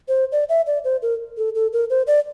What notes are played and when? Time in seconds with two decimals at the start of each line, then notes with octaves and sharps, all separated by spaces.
0.08 C5
0.32 D5
0.49 E5
0.67 D5
0.84 C5
1.02 A#4
1.37 A4
1.55 A4
1.73 A#4
1.90 C5
2.07 D5